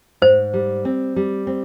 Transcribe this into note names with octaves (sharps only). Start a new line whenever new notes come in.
G#2 C5
G3
C4
G3
C4